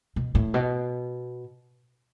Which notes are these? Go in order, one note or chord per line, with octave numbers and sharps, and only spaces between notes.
B2
A2
B2